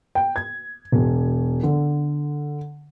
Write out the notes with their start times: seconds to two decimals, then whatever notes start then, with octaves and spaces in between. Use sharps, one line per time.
0.15 G5
0.36 G#6
0.92 E1
1.63 D3